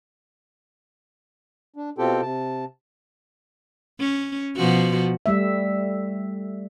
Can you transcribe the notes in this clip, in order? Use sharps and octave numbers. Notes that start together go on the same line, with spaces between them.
D4
B2 C4 F4 G4 A4 G5
C3 A5
C#4
B2 F3 F#4
G3 A3 E5